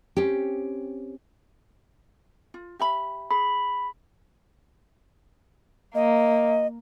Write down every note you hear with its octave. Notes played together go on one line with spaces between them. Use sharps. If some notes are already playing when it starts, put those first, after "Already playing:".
C4 C#4 G4
F4
G4 E5 B5
G#4 B5
A#3 D#5